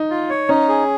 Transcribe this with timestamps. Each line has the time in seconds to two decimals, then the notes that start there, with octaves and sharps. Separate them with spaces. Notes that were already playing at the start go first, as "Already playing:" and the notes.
Already playing: D#4
0.10 F4
0.30 C#5
0.49 C#4 D#4
0.69 G#4